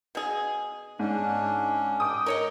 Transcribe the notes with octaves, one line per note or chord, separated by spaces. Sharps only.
B2 G#4
G#2 C#4 D4
G5 D6 D#6
A#4 C#5 D#5